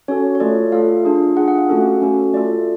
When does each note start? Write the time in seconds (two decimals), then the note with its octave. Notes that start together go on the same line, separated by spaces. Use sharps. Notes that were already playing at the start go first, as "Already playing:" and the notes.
0.08 C#4 F#4 A4 C#5
0.35 C#5
0.40 A3 F4 A4 D5
0.72 A3 F4 A4 F5
1.05 D4 F4 G#4
1.37 D4 F4 G#4 F#5
1.48 F#5
1.58 F5
1.69 A3 C#4 F#4 A4
2.02 A3 C#4 F#4 A4
2.34 A3 F4 A4 D5